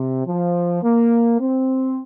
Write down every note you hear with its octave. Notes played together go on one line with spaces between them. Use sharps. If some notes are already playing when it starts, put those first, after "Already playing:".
Already playing: C3
F3
A#3
C4